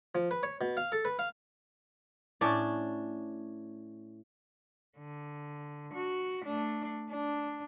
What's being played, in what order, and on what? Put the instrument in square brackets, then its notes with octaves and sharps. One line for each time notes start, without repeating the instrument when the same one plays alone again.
[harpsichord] F3
B4
C#5
B2
F5
A4
B4
F5
[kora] A2 C#4 D4 D5
[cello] D3
F#4
A3 D4
D4